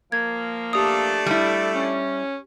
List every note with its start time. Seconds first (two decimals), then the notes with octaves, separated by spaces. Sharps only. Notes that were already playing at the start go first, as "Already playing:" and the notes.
0.12 F3 A#3 G#6
0.73 A3 D4 G4 A4 D#6
1.26 G3 E4
1.74 C#4